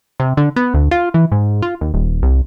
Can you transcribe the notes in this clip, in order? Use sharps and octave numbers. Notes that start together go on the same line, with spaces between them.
C3
D3
B3
D2
F4
E3
G#2
F4
D#2
D#1
C2